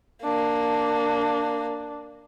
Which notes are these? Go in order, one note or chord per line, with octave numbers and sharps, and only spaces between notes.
A#3 D4